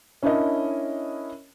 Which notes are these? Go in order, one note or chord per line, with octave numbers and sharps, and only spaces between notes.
C#4 D4 E4 A#4 C#5 D#5